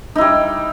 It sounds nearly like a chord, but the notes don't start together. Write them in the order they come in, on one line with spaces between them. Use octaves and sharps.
D#4 E4 G3